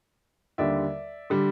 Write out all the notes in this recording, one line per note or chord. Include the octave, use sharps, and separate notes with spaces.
D#2 D3 G3 D5 E5
D3 G3